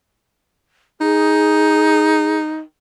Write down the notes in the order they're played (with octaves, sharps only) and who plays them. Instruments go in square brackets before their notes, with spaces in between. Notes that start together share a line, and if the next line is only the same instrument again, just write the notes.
[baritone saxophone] D#4 [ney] G#4